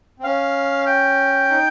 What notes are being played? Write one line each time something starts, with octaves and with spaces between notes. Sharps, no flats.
C4
C#4 F5
G5
D#4